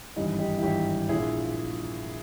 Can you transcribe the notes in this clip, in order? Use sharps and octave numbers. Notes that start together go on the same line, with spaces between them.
G#1 G2 E3 D#4 G4
D#4 G4
E4
G#1 G2 E3 D#4 G4
A#1 A#2 E4 G#4